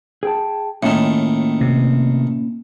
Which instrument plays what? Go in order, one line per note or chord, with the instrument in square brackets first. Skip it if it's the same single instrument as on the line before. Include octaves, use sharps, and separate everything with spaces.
[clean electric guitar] G#4 G5 A5
[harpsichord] A2 D#3 [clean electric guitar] A#3 C#4 F4
[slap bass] C3